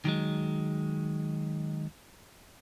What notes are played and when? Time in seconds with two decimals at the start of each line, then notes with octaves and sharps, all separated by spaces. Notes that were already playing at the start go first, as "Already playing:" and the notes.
0.05 D#3 F#3 G#3